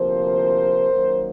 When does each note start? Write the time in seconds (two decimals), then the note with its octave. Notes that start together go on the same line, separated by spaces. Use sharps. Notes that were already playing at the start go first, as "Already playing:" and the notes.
Already playing: D2 C3 F3 A#3 A#4 C5
0.92 F#2 D#3 F#3 A#3